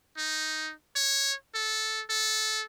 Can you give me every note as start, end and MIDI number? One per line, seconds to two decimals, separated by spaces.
0.18 0.72 63
0.96 1.34 73
1.55 2.03 69
2.10 2.64 69